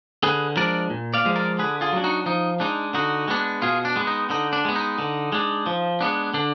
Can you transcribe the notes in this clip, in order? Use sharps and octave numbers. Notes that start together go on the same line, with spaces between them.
D3 G#4 B4
F3 G#3 D4 A#4 D5
A#2
D5 F5
F3 G#3
A#4 D5
D3 G#4 B4
F4 G#4
F#3 D4
D#4 F#4
F3 D#4
G#3 D4 D#4
D3 D#4 F#4
G#3 B3 D4
B2 F4 G#4
D4
G#3 B3
D#4
D3 D#4
D4
G#3 B3
D#4
D3
G#3 D4
F3
G#3 B3 D4
D3 D4